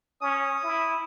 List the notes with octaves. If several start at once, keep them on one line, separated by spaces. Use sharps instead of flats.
C#4 D#6
E4